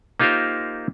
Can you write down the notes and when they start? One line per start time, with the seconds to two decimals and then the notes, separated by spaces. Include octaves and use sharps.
0.20 A#3 D#4 F4 G4 A#4 C5